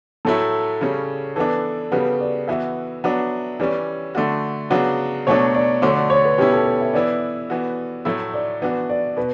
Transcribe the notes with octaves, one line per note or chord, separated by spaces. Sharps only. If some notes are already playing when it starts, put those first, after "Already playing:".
A2 F#3 A3 E4 A4
C#3 G3 C#4
E3 B3 D4 A4
C#3 G3 B3 F#4 B4
D5
E3 B3 F#4 E5
F#3 B3 D4 F#4
E3 G3 C#4 D5
D3 A3 D4 F#4
C#3 F#3 B3 D4 F#4
B2 F#3 A3 D4 C#5
D5
D3 A3 D4 F#4 C#5
D5
C#5
B4
B2 G3 C#4 E4 G4
A4
B4
E5
E3 B3 E4 D5
E3 B3 F#4
A2 F#3 A3 E4 E5
D5
E3 B3 D4 F#4 D5
D5
B2 B4